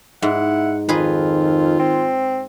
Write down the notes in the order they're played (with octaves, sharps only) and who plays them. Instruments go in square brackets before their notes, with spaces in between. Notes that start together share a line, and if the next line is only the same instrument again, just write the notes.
[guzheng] G#2 [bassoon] E4 [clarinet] F#5
[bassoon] F2 [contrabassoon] D#3 [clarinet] F4 [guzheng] G#4 B4
[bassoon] C4